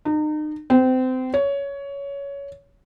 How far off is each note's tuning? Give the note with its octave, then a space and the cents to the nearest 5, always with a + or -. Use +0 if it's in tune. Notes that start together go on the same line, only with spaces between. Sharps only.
D#4 -35
C4 -25
C#5 +15